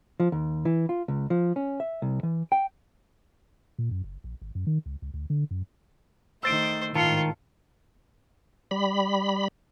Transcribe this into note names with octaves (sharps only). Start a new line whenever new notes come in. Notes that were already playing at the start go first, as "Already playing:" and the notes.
F3
D#2
E3
F4
C#2
F3
C#4
E5
C2
E3
G5
A#2
F#2
F#1
A#1
G#1
F#2
D#3
C#2
C#2
D2
D3
F#2
D#3 A3 C5 E6 A6 D7
G#1 A2 D#3 F4 A5 C#7
G3 B5